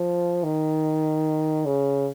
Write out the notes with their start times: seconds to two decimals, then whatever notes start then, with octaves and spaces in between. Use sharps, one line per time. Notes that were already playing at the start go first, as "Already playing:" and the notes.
Already playing: F3
0.43 D#3
1.66 C#3